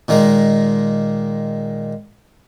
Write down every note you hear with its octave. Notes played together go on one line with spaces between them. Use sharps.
A#2 D#3 G#3 A#3